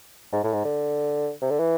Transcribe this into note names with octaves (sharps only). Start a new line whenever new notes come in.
G#2
A2
G#2
D3
C3
D3
E3